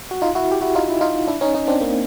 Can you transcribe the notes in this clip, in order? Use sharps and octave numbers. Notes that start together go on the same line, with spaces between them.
F#4
D#4 F4
E4 F#4
G4
E4 F#4
D#4 F4
E4
D#4 F4
D4 E4
C#4 D#4
C#4 D#4
C4 D4
A#3 C4